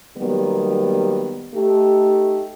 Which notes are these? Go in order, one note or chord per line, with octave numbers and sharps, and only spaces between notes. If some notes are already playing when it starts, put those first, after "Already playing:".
D#3 F#3 G3 A#3 B3
A3 D#4 G4